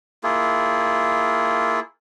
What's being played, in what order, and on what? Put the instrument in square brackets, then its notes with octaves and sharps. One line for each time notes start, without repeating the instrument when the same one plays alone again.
[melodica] A#3 E4 F4 G#4